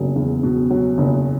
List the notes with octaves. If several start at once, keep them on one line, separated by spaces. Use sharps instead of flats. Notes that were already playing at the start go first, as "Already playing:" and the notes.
Already playing: F#1 B2 F#3
E2
B2
F#3
F#1